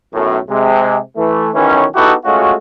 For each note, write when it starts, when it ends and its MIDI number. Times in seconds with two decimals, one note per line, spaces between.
0.14 0.39 35
0.14 0.39 42
0.14 0.39 45
0.50 0.98 48
0.50 0.98 56
1.17 1.50 52
1.17 1.50 57
1.55 1.84 35
1.55 1.84 51
1.55 1.84 52
1.55 1.84 61
1.95 2.14 59
1.95 2.14 63
1.95 2.14 64
1.95 2.14 66
1.95 2.14 67
1.95 2.14 69
2.25 2.54 56
2.25 2.54 57
2.25 2.54 61
2.25 2.54 65
2.25 2.54 66